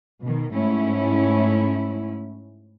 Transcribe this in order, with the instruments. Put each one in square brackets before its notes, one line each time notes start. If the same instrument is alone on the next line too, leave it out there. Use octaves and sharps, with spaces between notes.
[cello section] B2 D#3
G#2 A3 C#4 E4